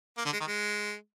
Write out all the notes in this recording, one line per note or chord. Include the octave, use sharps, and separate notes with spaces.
A#3
D3
G#3
D#3
G#3